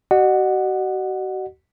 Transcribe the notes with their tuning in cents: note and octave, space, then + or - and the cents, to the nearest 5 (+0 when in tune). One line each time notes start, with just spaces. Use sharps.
F#4 +40 D#5 -45 F#5 +0